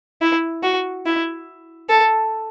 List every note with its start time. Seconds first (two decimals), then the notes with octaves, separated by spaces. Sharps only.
0.21 E4
0.63 F#4
1.06 E4
1.89 A4